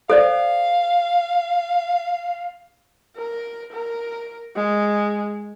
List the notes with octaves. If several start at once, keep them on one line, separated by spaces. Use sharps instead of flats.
A4 C5 D5 F5
A#4
A#4
G#3